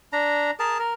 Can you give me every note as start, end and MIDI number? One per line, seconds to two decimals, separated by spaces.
0.13 0.51 62
0.13 0.51 82
0.59 0.78 68
0.59 0.78 70
0.59 0.78 81
0.79 0.94 70